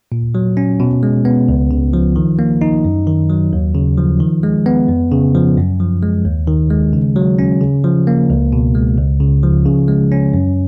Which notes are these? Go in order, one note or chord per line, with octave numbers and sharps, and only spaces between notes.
A#2
F#3
C#4
B2
G#3
B3
C#2
C#3
F3
D#3
A#3
D#4
F#2
D#3
F#3
D#2
C#3
F3
D#3
G#3
B3
F2
C#3
F3
F#2
F3
G#3
D#2
D#3
G#3
C#3
F#3
C#4
C#3
F3
A#3
C#2
B2
G#3
C#2
C#3
F3
C#3
G#3
C#4
F#2